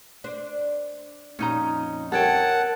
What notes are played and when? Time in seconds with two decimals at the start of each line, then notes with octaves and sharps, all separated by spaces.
0.24 D4 C5
1.39 F2 A#2 C#4 D#4 A#5
2.12 A4 A#4 C#5 F#5 G5 A5